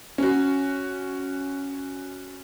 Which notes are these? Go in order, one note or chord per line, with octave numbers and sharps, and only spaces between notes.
C#4 F#4